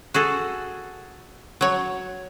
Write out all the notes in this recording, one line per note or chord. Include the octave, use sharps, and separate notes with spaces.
F#4 G#4 A4
F#3 C#5